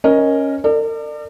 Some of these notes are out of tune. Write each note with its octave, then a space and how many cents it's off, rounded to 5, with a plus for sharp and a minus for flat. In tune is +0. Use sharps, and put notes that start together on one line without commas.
C#4 -5 A#4 +10 D#5 +0
A#4 -45 D5 +30